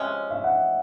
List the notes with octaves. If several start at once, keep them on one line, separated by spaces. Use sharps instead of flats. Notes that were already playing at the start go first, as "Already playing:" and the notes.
Already playing: C3 F3 G#3 C#4 D#5
E5
F#5